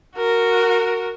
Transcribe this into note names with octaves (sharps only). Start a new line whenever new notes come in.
F#4 A#4